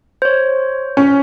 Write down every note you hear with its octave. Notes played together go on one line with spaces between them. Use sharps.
C5 C#5
C#4